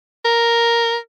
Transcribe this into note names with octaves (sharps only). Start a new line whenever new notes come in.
A#4